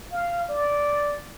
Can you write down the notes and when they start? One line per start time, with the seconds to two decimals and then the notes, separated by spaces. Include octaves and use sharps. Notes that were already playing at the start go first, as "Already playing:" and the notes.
0.12 F5
0.49 D5